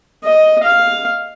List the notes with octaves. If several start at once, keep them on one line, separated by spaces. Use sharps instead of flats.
D#5
F5